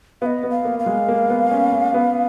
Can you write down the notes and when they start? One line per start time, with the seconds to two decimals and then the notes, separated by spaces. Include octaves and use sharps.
0.22 B3 D#5 F5
0.43 B3
0.50 F5
0.65 A#3
0.79 F5
0.86 G#3
1.08 A#3
1.30 B3
1.51 C#4
1.72 C#4
1.94 B3